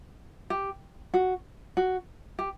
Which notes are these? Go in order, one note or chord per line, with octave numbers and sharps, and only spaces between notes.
G4
F#4
F#4
G4